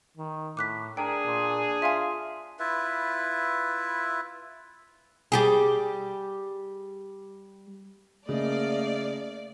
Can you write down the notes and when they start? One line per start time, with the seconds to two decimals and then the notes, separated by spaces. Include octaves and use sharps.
0.17 D#3
0.57 A2 D6 F#6 B6
0.97 D4 G#4 A#4 G5
1.26 A#2
1.82 F4 E5 F5 G#5
2.59 E4 F4 B4 E5
5.32 G3 G4 G#4
8.29 C#3 A3 A#3 D5 D#5 F5